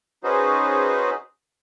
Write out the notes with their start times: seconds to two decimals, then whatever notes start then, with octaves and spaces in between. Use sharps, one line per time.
0.24 C#4 D#4 F#4 G#4 B4 C5